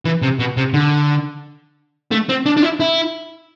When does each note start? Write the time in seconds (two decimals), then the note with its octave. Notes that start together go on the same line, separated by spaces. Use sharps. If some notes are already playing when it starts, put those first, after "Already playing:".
0.05 E3
0.22 C3
0.39 B2
0.57 C3
0.73 D3
2.11 A3
2.29 C4
2.46 D4
2.57 D4
2.62 E4
2.80 E4